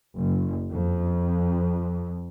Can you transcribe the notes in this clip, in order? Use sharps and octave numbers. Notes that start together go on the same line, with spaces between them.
F#1
F2